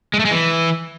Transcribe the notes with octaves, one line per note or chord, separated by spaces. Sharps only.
G#3
A3
G#3
E3